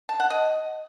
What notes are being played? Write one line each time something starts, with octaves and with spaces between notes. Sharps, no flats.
A5
F#5
D#5